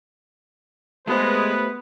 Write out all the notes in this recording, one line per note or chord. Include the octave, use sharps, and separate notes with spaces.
G#3 A3 B3 G4 B4 C5